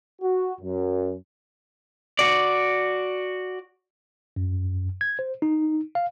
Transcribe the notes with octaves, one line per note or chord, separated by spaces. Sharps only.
F#4
F#2
F#4 D5
F#2
G#6
C5
D#4
F5